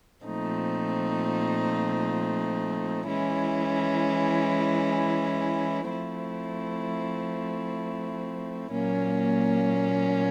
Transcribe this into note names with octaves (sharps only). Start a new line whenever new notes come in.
A#2 F3 A3 C4 D#4
E3 G#3 C#4 E4
F3 A3 C4 E4
A#2 F#3 A#3 C#4